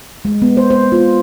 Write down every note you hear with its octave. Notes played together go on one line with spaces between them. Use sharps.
G#3
B3
C5
C5
F4